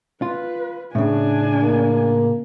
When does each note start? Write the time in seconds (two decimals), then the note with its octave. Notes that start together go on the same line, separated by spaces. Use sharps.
0.22 F4 B4
0.95 A2 C#3 D4 G#5
1.62 A#3